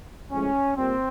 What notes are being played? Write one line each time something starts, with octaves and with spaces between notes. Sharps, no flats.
A2 F3 G#3 C#4
A#2 G3 A#3 C4